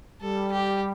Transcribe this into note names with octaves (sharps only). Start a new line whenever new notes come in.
G3 A4
G4